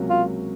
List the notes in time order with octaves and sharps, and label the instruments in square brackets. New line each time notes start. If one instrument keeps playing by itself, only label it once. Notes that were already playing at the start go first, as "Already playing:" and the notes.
Already playing: [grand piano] C#2 C3 F#3 A#3 C#4
[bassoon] F4